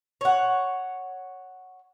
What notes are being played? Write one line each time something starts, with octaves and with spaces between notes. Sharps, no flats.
C#5 F#5